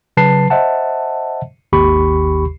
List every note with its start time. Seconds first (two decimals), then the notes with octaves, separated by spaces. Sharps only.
0.17 C#3 F#3 B4 A5 C7
0.50 C5 D#5 E5 F#5 A5
1.73 G#1 D#2 G4 B5 C#6